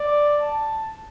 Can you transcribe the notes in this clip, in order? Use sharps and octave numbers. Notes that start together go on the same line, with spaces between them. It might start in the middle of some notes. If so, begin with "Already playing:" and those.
Already playing: D5
A5